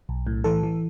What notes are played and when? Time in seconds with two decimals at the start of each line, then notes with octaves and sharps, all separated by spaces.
0.09 B1
0.27 A2
0.44 E3 A4
0.63 E3